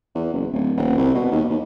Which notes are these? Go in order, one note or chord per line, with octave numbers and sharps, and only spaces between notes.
E2
F#1
D1
D#1
C2
B2
D#2
D#2